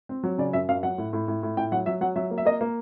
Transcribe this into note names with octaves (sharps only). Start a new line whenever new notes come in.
C4
F#3
C#3 D5
F#2 E5
F#2 F5
F#3 F#5
A2
A2
A2
A2
A2 G5
F#3 F#5
F#3 E5
F#3 F#5
F#3 E5
A#3
E5
A#3 D#5
A#3